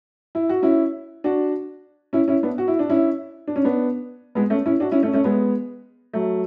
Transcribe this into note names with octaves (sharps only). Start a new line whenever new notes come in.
E4
F#4
C#4 E4
D4 F#4
C#4 E4
C#4 E4
B3 D4
F#4
E4
D4
C#4 E4
D4
C#4
B3 D4
G#3 B3
A3 C#4
C#4 E4
D4 F#4
C#4 E4
A3 C#4
A3 C#4
G#3 B3
F#3 A3